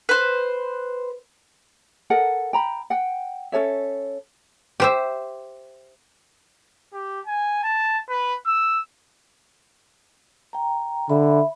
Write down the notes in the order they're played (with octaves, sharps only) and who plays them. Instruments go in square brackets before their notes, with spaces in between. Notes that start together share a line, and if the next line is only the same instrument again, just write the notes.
[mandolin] B4 C5
[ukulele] A4 A#4 D#5 F#5
G5 A#5 B5
F#5 G5
C#4 A4 C#5 E5
[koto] G4 C5 E5
[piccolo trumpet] G4
G#5
A5
B4
E6
[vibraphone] G5 A#5
[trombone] D3 [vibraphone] E5 B5